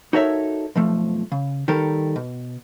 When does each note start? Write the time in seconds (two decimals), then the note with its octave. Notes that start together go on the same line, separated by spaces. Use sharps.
0.13 D#4 F#4 A4 A#4 C#5 E5
0.76 B1 F2 F3 A3
1.32 C#3
1.68 D#3 G3 A4 A#4
2.16 B2